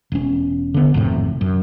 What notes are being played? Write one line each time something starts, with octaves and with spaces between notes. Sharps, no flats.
E1 C#4
D3 B3
G#1 F2 A2 C3
F#2